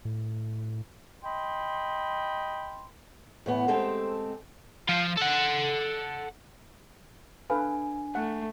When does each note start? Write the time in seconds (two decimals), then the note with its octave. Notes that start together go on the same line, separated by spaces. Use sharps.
0.05 A2
1.23 D#5 G5 B5 C6
3.46 A2 E3 B3
3.68 G#3 A3 C4 G4 A4 C5
4.89 F3 F4
5.17 A4 F#5
7.50 D4 A4 B4 F5 G#5
8.15 A3 F#5